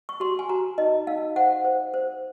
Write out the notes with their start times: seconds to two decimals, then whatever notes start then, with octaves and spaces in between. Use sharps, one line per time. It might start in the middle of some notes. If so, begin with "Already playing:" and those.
0.09 C#6
0.20 F#4 C6
0.39 G#5
0.49 F#4 A#5
0.78 D#4 D#5
1.07 D#4 F5
1.36 C5 F#5
1.65 C5
1.94 C5